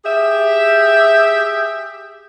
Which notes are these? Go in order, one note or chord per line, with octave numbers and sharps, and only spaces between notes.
G4 G#4 E5